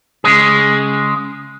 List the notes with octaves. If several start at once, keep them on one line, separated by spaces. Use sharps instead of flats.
C#3 G#3 G#4